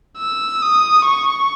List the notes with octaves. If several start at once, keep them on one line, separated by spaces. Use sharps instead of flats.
E6
D#6
C#6